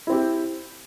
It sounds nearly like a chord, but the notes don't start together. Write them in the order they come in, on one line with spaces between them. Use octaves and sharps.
E4 C4 G4